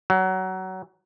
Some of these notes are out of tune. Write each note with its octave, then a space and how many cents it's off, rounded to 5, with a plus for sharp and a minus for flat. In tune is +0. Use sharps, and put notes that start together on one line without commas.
F#3 +20